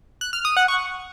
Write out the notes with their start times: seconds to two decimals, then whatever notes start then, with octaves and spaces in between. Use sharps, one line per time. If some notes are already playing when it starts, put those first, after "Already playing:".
0.21 F#6
0.33 F6
0.45 D#6
0.57 F#5
0.68 C#6